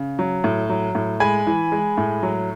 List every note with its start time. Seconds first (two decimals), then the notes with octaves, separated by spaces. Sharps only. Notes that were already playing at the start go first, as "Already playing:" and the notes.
Already playing: C#3
0.19 F#3
0.44 A2
0.70 F#3
0.95 A2
1.20 G#3 G#5 B5
1.47 E3
1.72 G#3
1.97 A2
2.23 F#3